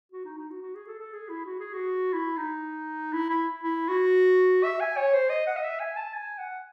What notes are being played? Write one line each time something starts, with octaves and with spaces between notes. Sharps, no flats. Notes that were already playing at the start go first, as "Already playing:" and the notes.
F#4
D#4
D#4
F#4
F#4
G#4
A4
A4
G#4
E4
F#4
G#4
F#4
E4
D#4
E4
E4
E4
F#4
E5
G#5
C#5
C5
D#5
F#5
D#5
E5
G#5
A5
G#5
F#5